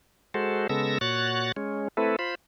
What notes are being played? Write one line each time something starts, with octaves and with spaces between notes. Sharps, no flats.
G#3 F#4 A4 C5
C#3 G#3 B3 A4 E6 A#6
A#2 F#4 C#5 F#6 A6
G#3 C#4
A3 C4 E4 A4 B4
F4 C5 B5